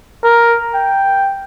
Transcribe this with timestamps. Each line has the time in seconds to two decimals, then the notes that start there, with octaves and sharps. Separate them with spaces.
0.24 A#4
0.74 G5